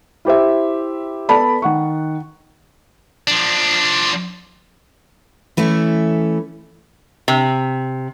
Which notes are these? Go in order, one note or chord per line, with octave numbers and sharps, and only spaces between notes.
E4 G4 C5 E5
B3 A4 D5 A5 B5
D#3 F#5 C#6
F3 D4
E3 A3 C#4 E4
C3